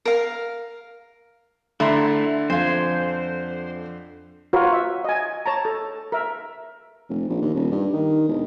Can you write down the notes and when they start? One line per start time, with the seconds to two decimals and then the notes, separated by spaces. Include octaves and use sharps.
0.05 A#4 F5
1.80 D3 A3 E4 A#5 C6
2.50 F2 F4 C5 G#5
4.53 F4 F#4 A#4 B4 C#5
4.72 E5
5.04 D#5 G#5
5.46 C#5 A5 A#5
5.65 A4
6.12 A#4 E5
7.09 F1
7.29 A#1
7.41 D#2
7.55 D#1
7.71 G2
7.93 D#3
8.28 E1